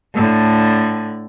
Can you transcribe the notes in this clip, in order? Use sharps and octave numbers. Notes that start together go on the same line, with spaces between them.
A2 D3